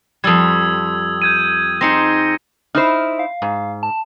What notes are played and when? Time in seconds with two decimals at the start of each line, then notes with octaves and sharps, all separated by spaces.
0.24 F2 G3 D#6 E6 G#6
1.22 G6 G#6 D#7
1.81 C4 D#4 G#4 A#6 C#7
2.75 D#4 E4 C5 F6
3.19 F5
3.42 G#2
3.83 A5